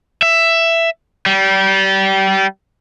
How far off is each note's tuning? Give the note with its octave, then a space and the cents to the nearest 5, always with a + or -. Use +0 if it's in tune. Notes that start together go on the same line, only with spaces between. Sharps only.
E5 +10
G3 -25